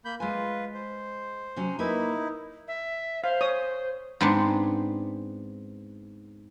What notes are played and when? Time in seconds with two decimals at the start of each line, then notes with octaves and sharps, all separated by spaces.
0.05 A#3 B5 G6
0.20 G#3 F4 B4 G#5
0.74 C5
1.56 C3 F#3 C#4
1.79 A#3 D#4 E4 B4
2.68 E5
3.24 C5 F5
3.41 C#5 D#6
4.21 G#2 B3 C4 D4